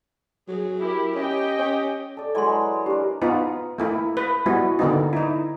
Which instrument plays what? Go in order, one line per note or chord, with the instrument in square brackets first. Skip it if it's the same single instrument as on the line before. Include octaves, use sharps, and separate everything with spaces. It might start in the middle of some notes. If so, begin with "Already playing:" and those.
[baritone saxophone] F#3 [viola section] G#4
[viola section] E4 G4 A#4
[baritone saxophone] C#4 [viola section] G4 D#5 G5
[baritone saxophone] C#4
[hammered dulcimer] A4 D5
[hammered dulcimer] E3 F#3 G#3 [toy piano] D5 A5 C6
[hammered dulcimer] D4 A#4 [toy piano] G4
[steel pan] B3 D#4 F4
A3 A#3 E4
B4
G3 G#3 B3 E4 F#4
D3 A#3 B3 D#4
D#4 E4